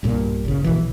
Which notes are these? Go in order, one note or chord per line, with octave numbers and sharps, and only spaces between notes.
B1 G2 A#2
G1 C#3
A#1 B2 E3